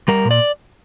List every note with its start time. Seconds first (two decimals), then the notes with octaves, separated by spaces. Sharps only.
0.08 G3 A#4
0.25 A#2
0.31 D5